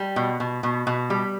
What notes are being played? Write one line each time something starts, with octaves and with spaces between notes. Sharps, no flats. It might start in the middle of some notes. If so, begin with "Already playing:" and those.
Already playing: G3
B2
B2
B2
B2
G3